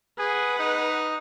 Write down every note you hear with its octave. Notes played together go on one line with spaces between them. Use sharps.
G#4 B4 F#5
D#4